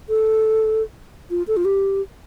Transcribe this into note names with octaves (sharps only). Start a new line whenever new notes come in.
A4
F4
A4
F4
G4